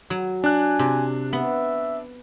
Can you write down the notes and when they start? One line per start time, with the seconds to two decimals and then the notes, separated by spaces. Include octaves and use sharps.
0.10 F#3
0.44 D4 G#5 F#6
0.79 C3
1.33 B3 E5